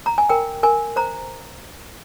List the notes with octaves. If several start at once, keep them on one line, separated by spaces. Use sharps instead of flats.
A#5
G#5
A#4 G5
A#4 G#5
C5 A#5